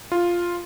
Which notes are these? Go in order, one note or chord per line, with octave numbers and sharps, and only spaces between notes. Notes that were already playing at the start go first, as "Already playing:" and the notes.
F4